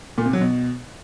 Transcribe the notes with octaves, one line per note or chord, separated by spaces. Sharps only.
A#2
C3
F#3
B2